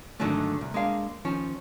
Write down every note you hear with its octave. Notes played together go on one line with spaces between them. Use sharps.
G#2 D3 D#3 F#3 A3
C2
G#3 A#3 D4 F5
D#3 F3 C#4